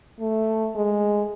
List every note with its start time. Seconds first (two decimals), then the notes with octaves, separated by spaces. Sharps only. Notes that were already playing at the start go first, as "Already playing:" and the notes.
0.20 A3
0.75 G#3